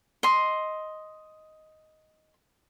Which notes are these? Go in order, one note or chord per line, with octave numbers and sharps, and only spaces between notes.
D#5 C6